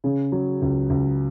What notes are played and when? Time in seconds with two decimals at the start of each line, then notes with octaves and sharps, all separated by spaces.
0.04 C#3
0.32 F#3
0.62 C#2
0.90 C#2